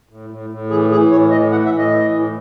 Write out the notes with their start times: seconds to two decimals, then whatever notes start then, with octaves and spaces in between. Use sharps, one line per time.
0.09 A2
0.30 A2
0.50 A2
0.70 E3 G#4
0.90 E3 G#4
1.11 A2 C#5
1.31 A2 D#5
1.51 E3 F#5
1.65 E5
1.72 A2
1.78 D#5
1.91 E3
2.12 A2